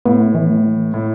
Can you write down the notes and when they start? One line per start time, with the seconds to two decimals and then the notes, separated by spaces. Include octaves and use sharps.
0.05 A2 B3
0.20 A3
0.35 E3
0.50 A3
0.94 A2